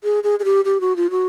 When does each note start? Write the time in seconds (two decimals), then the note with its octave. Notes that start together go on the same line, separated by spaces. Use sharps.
0.04 G#4
0.24 G#4
0.39 G#4
0.45 G4
0.65 G4
0.81 F#4
0.96 F4
1.10 F#4